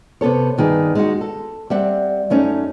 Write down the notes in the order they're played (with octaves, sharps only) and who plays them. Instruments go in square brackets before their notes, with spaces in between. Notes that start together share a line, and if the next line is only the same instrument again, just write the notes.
[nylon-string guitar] C3 B3 A4 C#5
G2 D#3 G#4 B4
G#3 D#4 F#4
A4
G3 C4 E5 F#5
F#2 A3 C#4 D#4